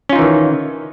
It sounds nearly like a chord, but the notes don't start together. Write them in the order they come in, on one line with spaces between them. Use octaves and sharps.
C#4 F4 D#4 E3 D#3